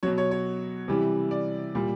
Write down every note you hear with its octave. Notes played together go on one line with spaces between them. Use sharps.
B2 F#3 C#5
C#5
C#5
C3 E3 G3
D5
A#2 G3